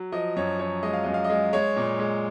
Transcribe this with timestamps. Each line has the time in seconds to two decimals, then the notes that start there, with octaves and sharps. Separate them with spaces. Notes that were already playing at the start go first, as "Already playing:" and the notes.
Already playing: F#3
0.12 F3 D#5
0.36 F#2 C#5
0.59 F3 C#5
0.83 G#3 D#5
0.93 F5
1.04 F#2 D#5
1.14 F5
1.24 D#5
1.30 G#3
1.53 G#3 C#5
1.76 A#2
1.99 G#3